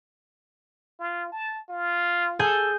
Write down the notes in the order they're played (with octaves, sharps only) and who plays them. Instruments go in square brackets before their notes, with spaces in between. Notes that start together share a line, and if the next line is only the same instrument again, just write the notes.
[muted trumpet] F4
A5
F4
[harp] G#4 G#5 G6 [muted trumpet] A4